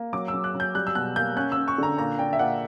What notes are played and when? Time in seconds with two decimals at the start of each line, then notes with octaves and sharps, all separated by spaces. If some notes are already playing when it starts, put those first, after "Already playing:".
Already playing: A#3
0.13 F#3 D6
0.28 E6
0.33 F#3
0.44 F#6
0.55 F#3
0.60 G6
0.75 G3 F#6
0.87 E6
0.95 B2 F#6
1.16 A#3 G6
1.36 C#4 F#6
1.52 E6
1.57 C#4
1.68 C#6
1.78 D3 A#5
1.98 A#2 A#5
2.19 D4 G5
2.33 E5
2.39 A#2 F#5